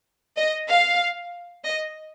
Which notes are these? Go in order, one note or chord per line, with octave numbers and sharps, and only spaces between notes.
D#5
F5
D#5